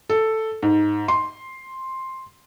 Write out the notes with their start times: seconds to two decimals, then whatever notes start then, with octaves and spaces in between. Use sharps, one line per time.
0.09 A4
0.62 G#2
1.08 C6